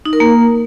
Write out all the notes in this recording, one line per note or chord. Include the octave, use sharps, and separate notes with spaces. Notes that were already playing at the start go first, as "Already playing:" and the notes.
D#4
A#4
A#3